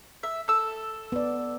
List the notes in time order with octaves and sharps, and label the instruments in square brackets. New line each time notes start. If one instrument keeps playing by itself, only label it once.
[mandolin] E5
A4 E6
[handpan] B3 D5